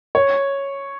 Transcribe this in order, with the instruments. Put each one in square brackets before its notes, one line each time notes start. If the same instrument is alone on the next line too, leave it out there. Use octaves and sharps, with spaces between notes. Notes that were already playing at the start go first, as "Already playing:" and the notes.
[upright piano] C#5